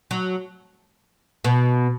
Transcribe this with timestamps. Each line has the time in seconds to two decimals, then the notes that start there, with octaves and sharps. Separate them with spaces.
0.11 F#3
1.44 B2